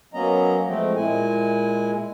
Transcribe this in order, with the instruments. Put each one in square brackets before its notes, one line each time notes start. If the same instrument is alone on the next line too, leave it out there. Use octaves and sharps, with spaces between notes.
[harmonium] F#3 A#3 B3 C#4 D#5 A#5
F3 G#3 A3 C4
A#2 G#3 E4 G#5